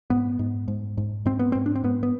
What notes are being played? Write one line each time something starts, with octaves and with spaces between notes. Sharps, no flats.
G#2 B3
G#2
G#2
G#2
G#2 C4
B3
G#2 C4
D4
C4
G#2 B3
B3